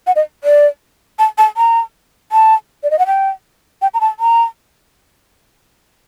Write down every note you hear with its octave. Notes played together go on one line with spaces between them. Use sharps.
F#5
D#5
D5
A5
A5
A#5
A5
D5
D#5
F#5
G5
G5
A#5
A5
A#5